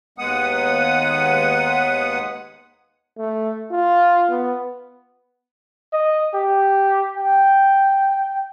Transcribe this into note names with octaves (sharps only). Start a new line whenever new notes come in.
D#2 G#3 B3 F#5 D#6
A3
F4
B3
D#5
G4
G5